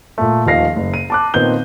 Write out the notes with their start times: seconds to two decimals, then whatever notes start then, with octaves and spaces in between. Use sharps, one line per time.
0.18 A#2 A3
0.45 D#1 F3 D#4 F5 A#6 C7
0.76 F#1
0.94 D#7
1.10 A5 D6 F#6
1.34 A#2 D#3 B3 C4 G6 G7